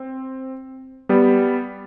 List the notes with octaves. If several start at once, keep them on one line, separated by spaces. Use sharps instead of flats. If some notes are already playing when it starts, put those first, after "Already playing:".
Already playing: C4
G3 B3